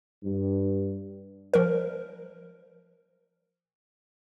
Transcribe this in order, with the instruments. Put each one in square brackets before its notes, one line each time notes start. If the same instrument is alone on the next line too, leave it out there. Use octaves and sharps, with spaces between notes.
[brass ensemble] G2
[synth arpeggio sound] F3 A#4